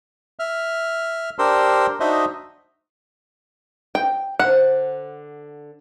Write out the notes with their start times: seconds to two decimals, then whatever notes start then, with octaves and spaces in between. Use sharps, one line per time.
0.39 E5 F6
1.39 D4 G4 A#4 C5 C6 E6
2.00 D4 D#4 F#4 C5 D#5 E5
3.95 D#5 G5
4.40 D3 C5 F#5